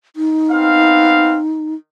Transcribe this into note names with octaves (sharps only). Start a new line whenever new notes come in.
D#4
B3 C4 F5